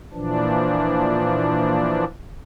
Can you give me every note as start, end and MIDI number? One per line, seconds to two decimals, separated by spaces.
0.13 2.04 46
0.13 2.04 52
0.13 2.04 53
0.13 2.04 62